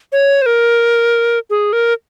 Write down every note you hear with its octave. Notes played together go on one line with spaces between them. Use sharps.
C#5
C5
A#4
G#4
A#4